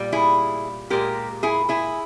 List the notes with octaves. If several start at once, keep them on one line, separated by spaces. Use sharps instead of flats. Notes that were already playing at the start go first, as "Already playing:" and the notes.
Already playing: A#2 G3
E4 G#4
A#2 G#3 G4 A#4
E4 G#4
E4 G#4